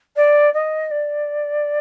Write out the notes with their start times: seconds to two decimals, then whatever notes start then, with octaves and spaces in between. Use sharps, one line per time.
0.16 D5
0.54 D#5
0.91 D5